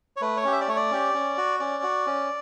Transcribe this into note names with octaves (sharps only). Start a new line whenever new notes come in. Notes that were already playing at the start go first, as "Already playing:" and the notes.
C#5
A3 B4
C#5
C#4 G4
E5
D5
A3 C#5
D5
C#4 G4
C#4
F#4
C#4 D5
F#4
C#4